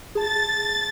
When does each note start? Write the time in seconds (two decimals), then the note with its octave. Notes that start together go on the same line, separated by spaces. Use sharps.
0.15 G#4 A5 A6